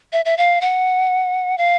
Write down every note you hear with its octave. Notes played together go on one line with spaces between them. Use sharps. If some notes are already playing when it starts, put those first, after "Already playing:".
E5
E5
F5
F#5
F5